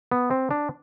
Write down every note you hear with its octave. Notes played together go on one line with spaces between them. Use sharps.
B3
C4
D4